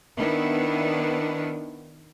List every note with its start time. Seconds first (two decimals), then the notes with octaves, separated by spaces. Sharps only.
0.16 D#3 B3 D4 E4